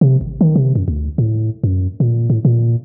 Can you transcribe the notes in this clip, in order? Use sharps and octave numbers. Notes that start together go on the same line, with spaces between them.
C3
G#1
D#3
C3
F#2
D2
A2
F#2
A#2
A2
A#2